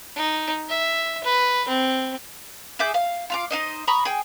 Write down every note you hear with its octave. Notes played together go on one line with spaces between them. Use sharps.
D#4
E5
B4
C4
G#4 E5 D6 G6
F5
F4 F5 D6
D#4 C5 D#5
A#5 B5 C#6 D#6
G#4 G5